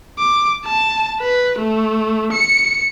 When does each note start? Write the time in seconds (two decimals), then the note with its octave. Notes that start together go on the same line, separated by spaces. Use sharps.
0.19 D6
0.65 A5
1.21 B4
1.59 A3
2.32 C#7